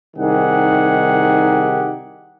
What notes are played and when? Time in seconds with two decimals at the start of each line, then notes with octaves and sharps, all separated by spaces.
0.17 C2 D#3 D#4 G4 G#4 F#5